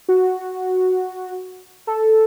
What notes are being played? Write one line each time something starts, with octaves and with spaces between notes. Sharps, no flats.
F#4
A4